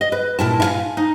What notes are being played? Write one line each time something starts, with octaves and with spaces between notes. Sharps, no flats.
D#5
B4
A#2 E4 A5
E4 F5 G#5
D#4